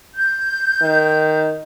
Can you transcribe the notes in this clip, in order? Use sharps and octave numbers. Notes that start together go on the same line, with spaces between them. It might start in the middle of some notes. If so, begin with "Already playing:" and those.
G6
D#3